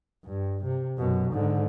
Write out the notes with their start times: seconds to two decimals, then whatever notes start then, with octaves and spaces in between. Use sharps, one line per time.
0.25 G2
0.64 C3
0.98 F#2 B2
1.32 G#2 D3